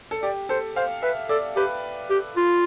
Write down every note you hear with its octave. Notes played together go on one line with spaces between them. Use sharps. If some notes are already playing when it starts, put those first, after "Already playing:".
A4
G4 D5
A4 C5
C5 F5
B4 E5
A4 D5
G4 B4
G4
F4